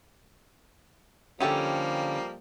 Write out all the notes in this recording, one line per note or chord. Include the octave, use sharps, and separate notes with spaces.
D3 D#3 F3 G3 A#3 C#4 G4 A4